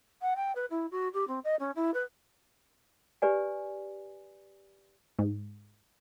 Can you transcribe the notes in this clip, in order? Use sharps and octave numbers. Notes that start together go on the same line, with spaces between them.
F#5
G5
B4
E4
F#4
G4
C4
D#5
C#4
E4
B4
G4 B4 D5 G#5
G#2